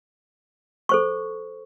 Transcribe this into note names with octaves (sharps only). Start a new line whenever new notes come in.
A4 C5 C#6